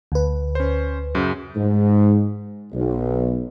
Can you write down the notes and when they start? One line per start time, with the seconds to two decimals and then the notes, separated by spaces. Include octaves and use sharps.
0.12 D2 B4
0.55 C#4 C5
1.15 F#2 C#3
1.56 G#2
2.73 B1